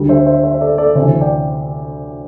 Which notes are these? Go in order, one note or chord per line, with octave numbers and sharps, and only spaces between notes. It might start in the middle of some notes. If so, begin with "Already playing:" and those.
Already playing: D2 D3 G3
C5 E5
C5 E5
C5 E5
E5
A4 D5
A4 D5
D2 C3 E3 C5 E5
D5 G5